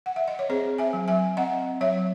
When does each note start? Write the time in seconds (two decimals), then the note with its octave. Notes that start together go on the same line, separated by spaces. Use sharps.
0.06 F#5
0.16 E5
0.28 D#5
0.39 C#5
0.49 C4 G#4 C5
0.78 E5 G#5
0.93 F#3
1.08 E5 G#5
1.37 C4 D#5 F#5
1.81 F#3 C#5 E5